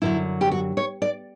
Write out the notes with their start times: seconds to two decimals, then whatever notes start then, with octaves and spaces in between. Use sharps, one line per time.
0.02 F#2 D3 F#3 E4
0.41 G4
0.52 F#4
0.77 C#5
1.02 D5